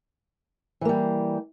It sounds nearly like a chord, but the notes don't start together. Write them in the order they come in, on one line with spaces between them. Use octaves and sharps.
E3 A#3 G3